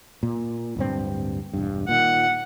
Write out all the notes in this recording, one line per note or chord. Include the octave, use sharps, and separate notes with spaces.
A#2
D1 G2 C4
E1 G2
A#2 D#3 F#5